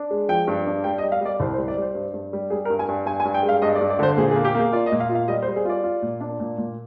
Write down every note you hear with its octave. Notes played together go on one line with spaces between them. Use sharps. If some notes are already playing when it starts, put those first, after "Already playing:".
Already playing: D4
G#3
F3 G5
G2
D4
G3 G5
D#5
G3
F5
G3 D5
C2 C5
C5
G3
D5
G3 C5
G2
G2
G3
G3 G#4
A#4
G2
G#5
G2
G2 G#5
G#5
G2
G5
G#3
F5
G2 D#5
D5
G2
D5
D3 C5
A#2 G#4
G#4
A#3
G4
A#3 G#4
F4 D5
D#5
A#2
F5
F4
F5
G3 D#5
C5
G3
G#4
F4 D5
F4
A#2
D4
A#2
A#2